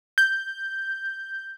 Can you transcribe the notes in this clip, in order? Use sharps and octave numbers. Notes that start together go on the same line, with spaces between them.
G6